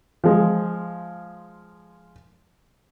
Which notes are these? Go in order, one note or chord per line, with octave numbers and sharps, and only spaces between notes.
F3 G#3